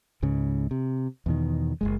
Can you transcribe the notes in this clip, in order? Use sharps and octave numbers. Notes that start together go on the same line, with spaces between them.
C#2 G#2 C#3
C3
E2 B2 D#3
F#1 D#2 G#3